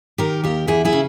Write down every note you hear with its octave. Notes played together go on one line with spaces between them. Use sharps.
D#3 G4 A#4
D#2 G4 A#4
E2 E4 G#4
E4 G#4
C#3